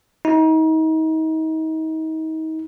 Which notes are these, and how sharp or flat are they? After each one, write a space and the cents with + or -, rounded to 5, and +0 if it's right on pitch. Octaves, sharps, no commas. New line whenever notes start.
D#4 +35